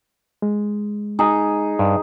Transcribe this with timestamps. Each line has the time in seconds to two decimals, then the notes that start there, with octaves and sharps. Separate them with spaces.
0.42 G#3
1.19 D#4 G#4
1.79 G2